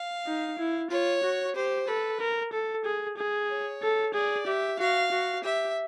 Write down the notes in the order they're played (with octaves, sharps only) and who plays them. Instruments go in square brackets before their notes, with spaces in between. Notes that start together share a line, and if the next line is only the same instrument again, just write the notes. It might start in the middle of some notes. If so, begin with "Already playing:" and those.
Already playing: [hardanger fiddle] F5
[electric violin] D#4
E4
[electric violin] F4 [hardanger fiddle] C#5
[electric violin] F#4
[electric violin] G4 [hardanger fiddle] C5
[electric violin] A4 [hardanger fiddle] B4
[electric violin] A#4
A4
G#4
G#4
[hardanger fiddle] C#5
[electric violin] A4
[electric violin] G#4 [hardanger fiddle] D5
[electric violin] G4 [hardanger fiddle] E5
[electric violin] F#4 [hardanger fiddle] F5
[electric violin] F#4
[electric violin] G4 [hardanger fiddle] E5